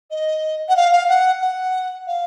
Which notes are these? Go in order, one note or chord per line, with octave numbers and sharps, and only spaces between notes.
D#5
F#5
F5
F5
F#5
F#5
F5